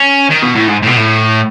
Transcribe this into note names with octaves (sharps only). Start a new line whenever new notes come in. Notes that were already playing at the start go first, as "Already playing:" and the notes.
Already playing: C#4
D#3
B2
A2
G#2
A2
B2
A2